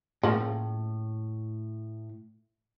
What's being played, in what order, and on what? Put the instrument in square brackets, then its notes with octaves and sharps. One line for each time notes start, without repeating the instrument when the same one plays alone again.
[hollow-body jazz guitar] A2 [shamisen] C#3 F3 A#3